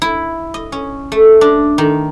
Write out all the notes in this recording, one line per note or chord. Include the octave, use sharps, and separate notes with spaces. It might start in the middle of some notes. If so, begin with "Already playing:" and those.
E4
D#5
C#4
A3
D4
D#3